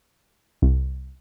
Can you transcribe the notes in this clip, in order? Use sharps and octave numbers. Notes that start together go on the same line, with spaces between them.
C2